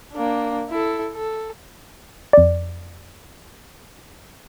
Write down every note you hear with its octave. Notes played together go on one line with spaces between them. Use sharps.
A#3 D4
E4 A4
A4
F2 D5